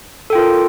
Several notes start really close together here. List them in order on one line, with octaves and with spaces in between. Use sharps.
A4 G5 F4 A#4